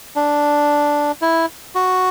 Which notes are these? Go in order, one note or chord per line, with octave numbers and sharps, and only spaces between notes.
D4
E4
F#4